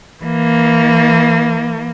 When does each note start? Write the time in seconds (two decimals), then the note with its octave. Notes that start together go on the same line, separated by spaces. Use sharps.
0.23 E3 A#3